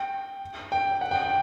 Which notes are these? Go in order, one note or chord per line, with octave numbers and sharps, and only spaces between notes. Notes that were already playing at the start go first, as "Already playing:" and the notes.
Already playing: G5
G5
F#5
G5
G5